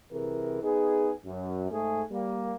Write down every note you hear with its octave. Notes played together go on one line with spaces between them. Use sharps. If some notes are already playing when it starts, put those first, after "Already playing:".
C2 C3 E3 G#4 A#4
B3 D#4 G#4
F#2
G#2 A3 G#4
G3 A#3